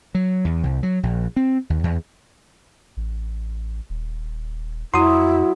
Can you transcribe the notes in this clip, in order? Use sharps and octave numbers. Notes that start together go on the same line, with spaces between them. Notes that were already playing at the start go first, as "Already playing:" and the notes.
F#3
E2
C2
F#3
A#1
C4
D#2
E2
A1
D#1
F2 F#3 E4 C6 D#6